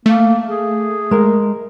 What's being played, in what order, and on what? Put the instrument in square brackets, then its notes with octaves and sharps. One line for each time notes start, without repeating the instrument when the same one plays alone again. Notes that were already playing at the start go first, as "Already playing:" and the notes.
[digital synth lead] A3 [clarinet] A#3
[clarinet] G#4
[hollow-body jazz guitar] G#3 A#4